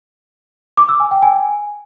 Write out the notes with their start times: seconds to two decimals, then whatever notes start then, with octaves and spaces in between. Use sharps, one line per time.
0.77 D6
0.89 E6
1.00 G#5
1.11 G5
1.22 G#5